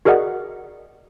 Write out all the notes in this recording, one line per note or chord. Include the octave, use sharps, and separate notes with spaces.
F#4 G#4 A#4 D5 D#5 F#5